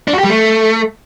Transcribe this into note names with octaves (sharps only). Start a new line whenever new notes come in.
D4
F#4
G4
G3
A3